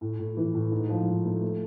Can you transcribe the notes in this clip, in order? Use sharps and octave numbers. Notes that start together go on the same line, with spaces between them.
A2
A2
E3
A2
G#2
F3
G#2
A3
A3